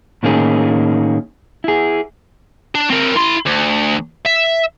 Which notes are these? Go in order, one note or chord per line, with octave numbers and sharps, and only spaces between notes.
A2 D#3 A#3 C#4 D#4 G#4
E4 G#4
D4
C4 A#4
E4 C6
D2
E5